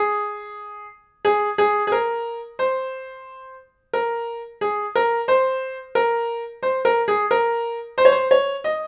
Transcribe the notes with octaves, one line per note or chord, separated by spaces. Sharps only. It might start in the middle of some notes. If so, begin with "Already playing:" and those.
Already playing: G#4
G#4
G#4
G#4
A#4
C5
A#4
G#4
A#4
C5
A#4
C5
A#4
G#4
A#4
C5
C#5
C5
C#5
D#5